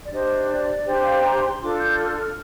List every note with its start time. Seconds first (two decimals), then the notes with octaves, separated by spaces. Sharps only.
0.04 D5
0.11 D4 G4 C5 D#5
0.48 D5
0.85 D4 G4 C5
1.04 F5
1.22 A#5
1.41 C6
1.60 D4 F4 A4 D6
1.78 G6
1.97 F6
2.15 F6